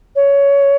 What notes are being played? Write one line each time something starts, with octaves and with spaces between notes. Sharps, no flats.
C#5